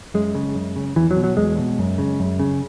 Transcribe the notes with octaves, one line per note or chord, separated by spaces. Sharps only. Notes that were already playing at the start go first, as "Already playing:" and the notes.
F#2 G#3
C#3
F#2
C#3
E2 E3
F#3
B2
F#3
E2 G#3
B2
F#2
C#3
F#2
C#3